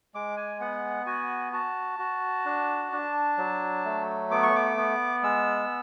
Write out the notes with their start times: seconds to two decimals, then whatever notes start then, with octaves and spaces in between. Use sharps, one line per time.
0.14 G#3 D6
0.37 G#5
0.60 B3 F#5
1.06 F#4 G#5
1.53 F#4 A5
1.99 F#4
2.45 D4
2.92 D4
3.38 F#3
3.85 A3
4.31 B3 D6
4.43 C#6
4.55 D6
4.77 B3
5.23 G#3 E6